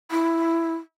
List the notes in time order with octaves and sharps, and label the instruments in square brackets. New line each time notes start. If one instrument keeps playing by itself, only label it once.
[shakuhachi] E4